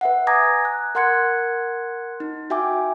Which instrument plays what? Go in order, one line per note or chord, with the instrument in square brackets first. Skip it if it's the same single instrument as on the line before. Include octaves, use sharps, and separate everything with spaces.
[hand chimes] B4 E5 F#5
G#5 A#5 D6 D#6 G#6 A#6
F#6
A#4 F#5 C6 F#6 G#6 C#7
D#4
F#4 E5 G5 G#5 D6